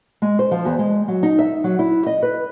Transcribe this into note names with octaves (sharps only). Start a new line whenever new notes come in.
G#3
C5
F3
E2
G#3
F#3
D#4
E5
F#3
E4
D#5
B4